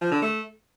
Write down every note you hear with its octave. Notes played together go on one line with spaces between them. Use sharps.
F3
D3
A3